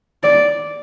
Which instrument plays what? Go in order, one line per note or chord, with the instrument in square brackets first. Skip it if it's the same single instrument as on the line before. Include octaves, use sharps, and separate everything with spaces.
[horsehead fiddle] D5